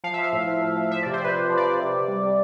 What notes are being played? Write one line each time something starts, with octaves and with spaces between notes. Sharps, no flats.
F3 F5
F3 E5
F5
A2
F3
F3
F3
F3 E5
C3 D5
C5
C3 B4
C3
F3
D5
F3
C3
C3
G3
C3